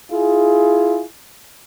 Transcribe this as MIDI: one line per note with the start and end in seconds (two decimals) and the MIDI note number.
0.12 1.04 64
0.12 1.04 65
0.12 1.04 68